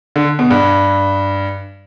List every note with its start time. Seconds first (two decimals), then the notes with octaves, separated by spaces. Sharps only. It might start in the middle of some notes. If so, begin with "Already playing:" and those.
0.16 D3
0.39 B2
0.51 G2